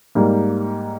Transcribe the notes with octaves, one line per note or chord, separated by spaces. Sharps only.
G#2 G3 A#3